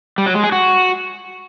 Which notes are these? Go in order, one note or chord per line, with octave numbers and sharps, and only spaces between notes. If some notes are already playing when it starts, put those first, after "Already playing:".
G3
F#3
G#3
G#4
F#4